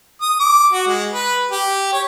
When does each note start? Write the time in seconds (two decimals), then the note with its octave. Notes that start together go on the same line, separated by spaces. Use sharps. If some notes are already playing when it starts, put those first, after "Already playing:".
0.22 D#6
0.40 D6
0.73 F#4
0.87 G#3
1.11 B4
1.52 G4
1.93 C#5